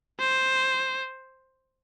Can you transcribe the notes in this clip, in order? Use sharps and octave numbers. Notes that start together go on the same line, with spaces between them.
C5